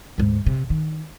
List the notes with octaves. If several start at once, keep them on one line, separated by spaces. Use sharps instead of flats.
D2 G#2
C3
D#3